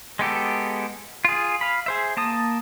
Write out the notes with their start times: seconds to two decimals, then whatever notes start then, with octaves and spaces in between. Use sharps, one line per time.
0.19 G#3 B3 G4 A4
1.25 F4 G#4
1.61 F5 B5
1.86 G#4 C5 E5
2.17 A#3 A5 D#6